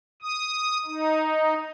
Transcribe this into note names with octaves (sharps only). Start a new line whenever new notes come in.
D#6
D#4